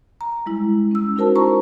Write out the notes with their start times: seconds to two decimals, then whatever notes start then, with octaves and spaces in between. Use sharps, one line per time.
0.21 A#5
0.46 G3 G#3 E4
0.91 C#4 E6
1.16 D#4 E4 F#4 A#4 C5 A5
1.36 C5 A5 A#5 C#6